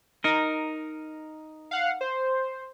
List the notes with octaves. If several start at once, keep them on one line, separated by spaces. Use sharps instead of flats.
D#4 A#4
F5 F#5
C5